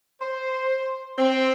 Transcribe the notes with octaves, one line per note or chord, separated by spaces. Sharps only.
C5
C4